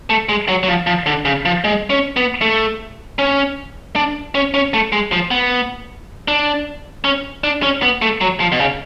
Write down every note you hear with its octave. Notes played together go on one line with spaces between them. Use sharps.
A3
G#3
F#3
F#3
F3
F3
D3
C#3
F3
G#3
C#4
B3
A3
C#4
D4
C#4
C#4
A3
G#3
F3
B3
D4
C#4
D4
C#4
B3
A3
F#3
F3
B2
C#3